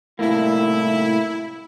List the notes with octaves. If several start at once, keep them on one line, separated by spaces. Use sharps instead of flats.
C2 A2 A#3 E4